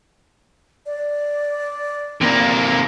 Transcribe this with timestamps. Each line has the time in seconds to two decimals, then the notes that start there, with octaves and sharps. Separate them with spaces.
0.86 D5
2.21 C3 A#3